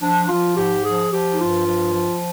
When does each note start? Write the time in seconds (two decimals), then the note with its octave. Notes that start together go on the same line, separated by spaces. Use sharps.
0.01 F3 D4
0.29 F3 F4
0.56 G#2 G4
0.84 F3 G#4
1.12 F3 G4
1.31 D#4
1.39 G2 F4
1.67 F3
1.94 F3